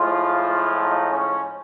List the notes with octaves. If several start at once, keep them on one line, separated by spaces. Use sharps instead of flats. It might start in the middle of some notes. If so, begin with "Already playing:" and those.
Already playing: A2 F3 G#3 F4
D#4
C#4